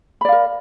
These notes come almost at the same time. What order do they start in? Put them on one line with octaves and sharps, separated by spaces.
B5 D5 F5 A#4